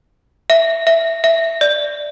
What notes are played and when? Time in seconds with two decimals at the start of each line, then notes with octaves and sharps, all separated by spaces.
0.50 E5
0.87 E5
1.24 E5
1.61 D5